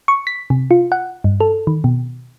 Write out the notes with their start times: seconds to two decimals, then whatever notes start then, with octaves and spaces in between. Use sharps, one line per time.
0.08 C#6
0.27 B6
0.50 C3
0.71 F4
0.92 F#5
1.24 G2
1.40 A4
1.67 D#3
1.84 B2